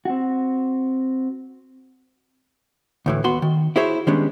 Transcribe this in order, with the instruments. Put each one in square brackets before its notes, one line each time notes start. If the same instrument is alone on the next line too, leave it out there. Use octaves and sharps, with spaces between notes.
[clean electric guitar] C4 F#4
[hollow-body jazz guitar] D2 A2 E3
D#2 B3 F#4 C6
D#3
E4 F#4 G#4 C5 C#5 E5
D#3 G3 G#3 B3 C#4 D4